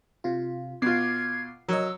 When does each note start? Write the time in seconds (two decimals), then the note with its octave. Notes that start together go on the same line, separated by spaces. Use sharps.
0.24 C3 F4
0.82 B2 F4 D6 G#6 C7
1.69 F#3 A#4 D#5 E6